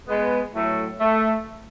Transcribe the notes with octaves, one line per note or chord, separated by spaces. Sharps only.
G#3 B3
A2 F#3 A3
A3